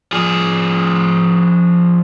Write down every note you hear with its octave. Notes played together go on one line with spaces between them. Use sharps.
F3 G#4